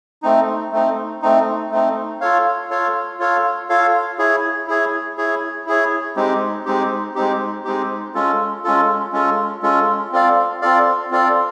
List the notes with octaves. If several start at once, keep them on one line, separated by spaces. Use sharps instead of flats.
A3 C4 D#4
A3 C4 D#4
A3 C4 D#4
A3 C4 D#4
F4 A4 C#5 F5
F4 A4 C#5 F5
F4 A4 C#5 F5
F4 A4 C#5 F5
E4 G#4 C#5
E4 G#4 C#5
E4 G#4 C#5
E4 G#4 C#5
G#3 C4 D#4 G4
G#3 C4 D#4 G4
G#3 C4 D#4 G4
G#3 C4 D#4 G4
G#3 C#4 F4 A4
G#3 C#4 F4 A4
G#3 C#4 F4 A4
G#3 C#4 F4 A4
C4 F4 A4 D5 F5
C4 F4 A4 D5 F5
C4 F4 A4 D5 F5